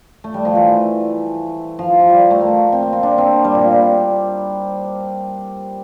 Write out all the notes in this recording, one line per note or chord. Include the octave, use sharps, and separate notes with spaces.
A3
G3
F3
E3
F3
F3
G3
A3
A#3
C4
A#3
C4
D4
C4
G3
A#2